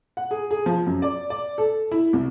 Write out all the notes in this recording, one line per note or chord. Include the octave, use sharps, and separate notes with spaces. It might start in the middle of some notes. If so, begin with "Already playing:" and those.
F#5
G#4
G#4
F3
F#2
D5
D5
A4
E4
C2